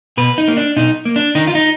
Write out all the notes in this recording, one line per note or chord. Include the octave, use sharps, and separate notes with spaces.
B2 B4
D#4
A#3
D4
B2 D#4
A#3
D4
D#3 D#4
F4
D#4